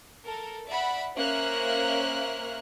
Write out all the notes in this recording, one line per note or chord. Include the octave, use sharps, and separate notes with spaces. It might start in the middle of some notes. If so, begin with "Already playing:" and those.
A4 A#4
D5 E5 F#5 B5
A#3 C#4 C5 E5 F6 F#6